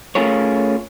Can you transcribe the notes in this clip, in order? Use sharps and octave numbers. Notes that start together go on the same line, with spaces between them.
A3 C#4 F4 G#4 A#4 C#5